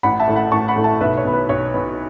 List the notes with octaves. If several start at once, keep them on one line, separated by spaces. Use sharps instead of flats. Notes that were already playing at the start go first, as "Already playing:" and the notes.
A1 F#5 B5
E5 A5
A2 A3
F#5 B5
A1 A5 C#6
F#5 B5
A2 A3
E5 A5
B1 B4 E5
C#5
B2 B3
B4
B1 C#5
B2 B3